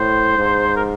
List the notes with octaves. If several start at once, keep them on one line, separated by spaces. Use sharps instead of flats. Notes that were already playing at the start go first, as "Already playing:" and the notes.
Already playing: A2 C5
G#2
A#4